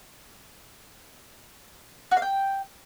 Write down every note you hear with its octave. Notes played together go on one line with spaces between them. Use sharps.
F#4
F5
G5